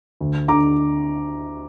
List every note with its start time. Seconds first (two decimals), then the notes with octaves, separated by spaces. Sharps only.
0.21 D2
0.48 D3 A#5 D6